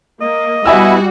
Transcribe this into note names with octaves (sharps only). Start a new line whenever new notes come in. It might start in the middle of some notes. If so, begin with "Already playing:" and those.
A#3 D#5
B2 G3 E4 F#4 E5 G#5 E6